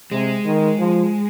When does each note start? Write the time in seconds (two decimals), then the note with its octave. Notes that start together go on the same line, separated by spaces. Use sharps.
0.11 C3 G#3
0.45 D#3
0.79 F3